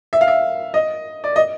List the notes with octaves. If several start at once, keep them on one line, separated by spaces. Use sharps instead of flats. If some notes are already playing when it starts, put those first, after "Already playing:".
E5
F5
E5
D#5
D5
D#5